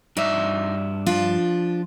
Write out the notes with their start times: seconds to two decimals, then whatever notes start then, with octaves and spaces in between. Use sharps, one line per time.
0.17 G2 D#4 D5 E5
1.06 F3 D4 F4